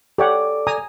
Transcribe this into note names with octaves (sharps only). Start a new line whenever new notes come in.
G4 A4 C#5 D5 F#5 D6
G#5 A#5 D#6